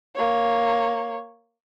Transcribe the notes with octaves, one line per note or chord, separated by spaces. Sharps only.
A#3 C#5